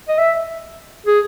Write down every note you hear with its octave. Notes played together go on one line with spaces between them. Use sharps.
D#5
E5
G#4